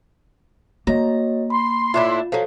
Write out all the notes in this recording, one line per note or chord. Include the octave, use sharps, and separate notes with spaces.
A#3 F#4 C#5 D#5 A#5
B5 C6
A2 D4 E4 F4
F3 F#3 A4 C5